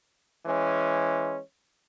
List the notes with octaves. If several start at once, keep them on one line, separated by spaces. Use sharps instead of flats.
E3 G#3 C#4